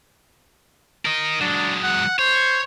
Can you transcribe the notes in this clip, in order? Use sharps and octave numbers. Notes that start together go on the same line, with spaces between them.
A#4 D#5
F#3 G#3 D4
F#5
C5 C#5